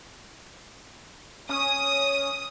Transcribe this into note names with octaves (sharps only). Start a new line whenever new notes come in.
C#4 D#6